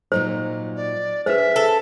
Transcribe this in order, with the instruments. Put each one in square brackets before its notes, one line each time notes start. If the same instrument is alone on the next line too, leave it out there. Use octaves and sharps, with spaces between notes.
[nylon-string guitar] A#2 F#3 D#4 [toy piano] C5
[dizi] D5
[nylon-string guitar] D4 G#4 [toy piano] B4 C5 [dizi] E5
[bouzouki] A4